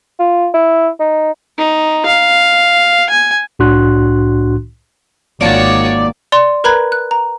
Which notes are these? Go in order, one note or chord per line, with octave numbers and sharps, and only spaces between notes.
F4
E4
D#4
D#4
F5
G#5
C2 A2 D4 F#4 C6 F#6
G#1 D#3 A#3 F4 F#4 C#5 D5 A5
D5 C6 F7
A#4 B4 A#5 B5 F#6 G#6
F#6
A#5